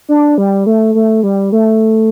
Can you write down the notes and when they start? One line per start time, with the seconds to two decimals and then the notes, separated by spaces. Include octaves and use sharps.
0.09 D4
0.38 G3
0.66 A3
0.95 A3
1.23 G3
1.52 A3